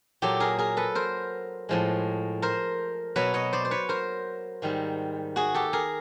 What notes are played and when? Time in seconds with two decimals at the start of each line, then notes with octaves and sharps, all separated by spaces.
0.22 A#2 F#3 G4 A4
0.40 G#4 A#4
0.58 G#4 A#4
0.77 A4 B4
0.95 A#4 C5
1.69 A2 F3 G#3
2.42 A#4 C5
3.16 B2 F#3 B4 C#5
3.34 C#5 D#5
3.53 C5 D5
3.65 C5
3.71 B4 C#5
3.89 A#4 C5
4.62 G#2 D#3 G3
5.36 F#4 G#4
5.54 G4 A4
5.73 G#4 A#4